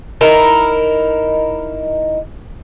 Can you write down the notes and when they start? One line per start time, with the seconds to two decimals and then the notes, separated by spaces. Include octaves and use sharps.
0.21 D#4 E4 A#4